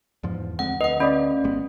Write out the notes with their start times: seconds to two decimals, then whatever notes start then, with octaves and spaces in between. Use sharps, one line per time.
0.23 E2 G#2 F3
0.59 D2 G#3 C4 F#5
0.81 D2 B4 D#5 F#5
1.00 C#4 D5 D#5 B5
1.44 G#1 G#3 B3